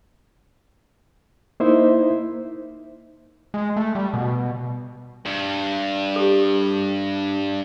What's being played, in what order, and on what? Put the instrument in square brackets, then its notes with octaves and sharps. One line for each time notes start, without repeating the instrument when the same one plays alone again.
[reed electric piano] A#3 D#4 E4 C5 E5
[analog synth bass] G#3
A3
G3
B2
[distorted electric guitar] G2
[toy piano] G4 A4